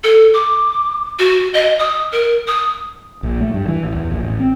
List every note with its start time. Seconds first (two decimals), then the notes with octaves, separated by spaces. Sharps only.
0.04 A4
0.34 D6
1.19 F#4
1.54 D#5
1.79 D#6
2.12 A#4
2.47 D#6
3.23 A#1
3.40 A3
3.54 G2
3.68 E3
3.83 A1
3.96 E2
4.11 A#1
4.23 A1
4.40 C4